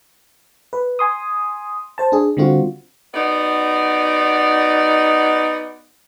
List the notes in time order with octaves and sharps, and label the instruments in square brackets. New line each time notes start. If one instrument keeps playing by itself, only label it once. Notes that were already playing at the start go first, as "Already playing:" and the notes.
[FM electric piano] B4
G#5 C6 D#6
C5 A5
D4 G#4
D3 G3 C4 F4 F#4
[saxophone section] B3 D#4 F#4 D5